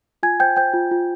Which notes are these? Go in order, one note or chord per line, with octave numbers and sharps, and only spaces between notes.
F4 G#5 G#6
C5 G5 G6
C5 G5 G6
F4
F4